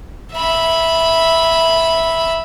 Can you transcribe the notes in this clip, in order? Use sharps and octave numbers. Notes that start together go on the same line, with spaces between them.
E5 B5